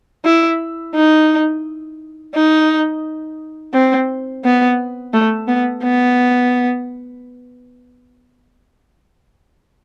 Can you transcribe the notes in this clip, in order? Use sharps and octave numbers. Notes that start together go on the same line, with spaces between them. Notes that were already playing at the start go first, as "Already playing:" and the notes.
E4
D#4
D#4
C4
B3
A3
B3
B3